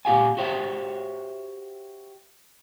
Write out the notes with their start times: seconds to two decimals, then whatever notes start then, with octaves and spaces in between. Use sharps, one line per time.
0.05 A#2 G4 F5 G#5
0.37 F#4 G4 C5 C#5 E5